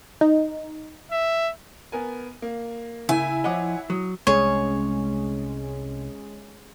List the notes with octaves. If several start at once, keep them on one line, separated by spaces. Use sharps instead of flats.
D#4
E5
B3 A#4 G#5
A#3
C#3 E4 G#5
F3 C#5 D#5 F#5 D6
F#3 D#6
C2 G#3 C#4 G#4 C#5